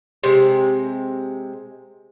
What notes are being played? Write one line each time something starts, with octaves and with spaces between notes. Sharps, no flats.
C3 G#3